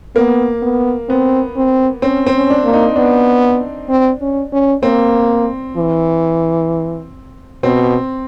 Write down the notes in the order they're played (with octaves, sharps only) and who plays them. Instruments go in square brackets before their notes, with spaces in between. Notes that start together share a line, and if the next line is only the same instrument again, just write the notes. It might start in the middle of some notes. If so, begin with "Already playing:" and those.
[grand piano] A#3 [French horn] B3
[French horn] B3
[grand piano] B3 [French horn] C4
[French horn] C4
[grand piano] C4 [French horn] C#4
[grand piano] C4
[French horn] C#4
[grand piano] D4
[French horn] A#3
[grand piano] D#4
[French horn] B3 [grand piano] D4
[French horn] C4
C#4
C#4
[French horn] A#3 [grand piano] C4
[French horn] E3
[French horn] B2 [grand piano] C4